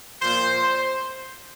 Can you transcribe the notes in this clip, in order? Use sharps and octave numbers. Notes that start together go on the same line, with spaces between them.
A#2 F3 C5
C5